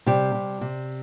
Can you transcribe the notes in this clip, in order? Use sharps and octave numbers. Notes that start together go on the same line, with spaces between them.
C3 G3 G4
C3
C3